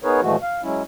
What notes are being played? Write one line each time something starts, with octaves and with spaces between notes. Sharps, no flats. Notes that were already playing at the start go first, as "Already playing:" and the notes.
B3 D#4 G#4 A#4 B4 C#5
A#2 E3 F3 G#3 A3 F#4
F5
F#3 G#3 C#4 E4